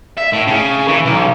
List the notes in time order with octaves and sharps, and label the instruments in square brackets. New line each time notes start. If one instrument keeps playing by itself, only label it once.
[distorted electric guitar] E5
A2
C#3
E3
B1